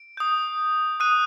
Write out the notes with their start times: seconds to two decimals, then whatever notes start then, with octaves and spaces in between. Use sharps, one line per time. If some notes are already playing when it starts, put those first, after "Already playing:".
Already playing: D7
0.17 D#6 G6
1.00 D#6 F#6 D#7